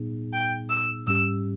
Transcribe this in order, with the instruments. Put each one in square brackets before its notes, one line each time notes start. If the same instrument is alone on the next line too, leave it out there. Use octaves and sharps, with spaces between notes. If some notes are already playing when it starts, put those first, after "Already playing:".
Already playing: [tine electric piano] A#2 G3 B3 D#4 G#4
[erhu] G5
E6
[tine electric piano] G#2 G3 C#4 G4 [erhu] E6